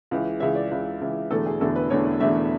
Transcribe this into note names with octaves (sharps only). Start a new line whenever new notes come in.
C#2 C#3 E3
C#2 C#3 E3 E5
D5
C#2 C#3 E3
C#2 C#3 E3
E1 E2 D3 A3 A4
G#4
E1 E2 D3 A3 A4
B4
E1 E2 D3 A3 C#5
E1 E2 D3 A3 E5